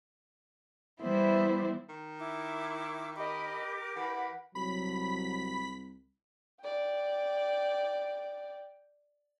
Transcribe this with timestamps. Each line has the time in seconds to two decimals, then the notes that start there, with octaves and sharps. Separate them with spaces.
1.01 E3 G3 B3 E4 C5
1.89 D#3
2.19 E4 D6
3.16 G4 A#4 D#5 B5 D6
3.96 E3 F#5 B5
4.55 C2 F#3 B5 B6
6.63 D5 G5